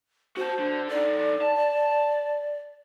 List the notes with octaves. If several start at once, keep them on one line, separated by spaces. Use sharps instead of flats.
F#4 C5 A5
D3
D#4 A4 D5
A5